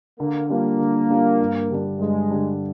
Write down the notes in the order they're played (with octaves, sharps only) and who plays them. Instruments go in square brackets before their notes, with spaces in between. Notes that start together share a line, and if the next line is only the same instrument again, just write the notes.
[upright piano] D3 [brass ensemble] A#3
[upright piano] G3 D4 F4 [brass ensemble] A#3
[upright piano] D3
G3 D4 F4
G2
D3 G3 D4
[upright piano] G2 [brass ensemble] G#3
[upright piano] D3 G3 D4